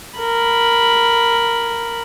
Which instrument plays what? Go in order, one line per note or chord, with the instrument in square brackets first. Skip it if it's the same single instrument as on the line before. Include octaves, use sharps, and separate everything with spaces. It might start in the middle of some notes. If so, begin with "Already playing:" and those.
[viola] A#4 B5